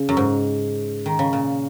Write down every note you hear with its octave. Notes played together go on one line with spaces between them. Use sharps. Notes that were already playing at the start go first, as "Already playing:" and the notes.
Already playing: C#3
F#2
G#2
D#3
C#3
A#2